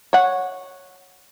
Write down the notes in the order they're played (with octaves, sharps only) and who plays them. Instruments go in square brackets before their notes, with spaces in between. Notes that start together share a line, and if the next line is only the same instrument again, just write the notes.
[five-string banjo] C#5 F#5